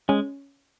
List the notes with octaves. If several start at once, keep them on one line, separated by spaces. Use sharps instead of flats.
G#3 C#4